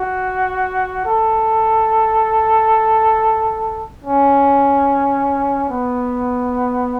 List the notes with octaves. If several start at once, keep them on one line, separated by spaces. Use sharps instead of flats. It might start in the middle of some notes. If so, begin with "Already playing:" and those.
Already playing: F#4
A4
C#4
B3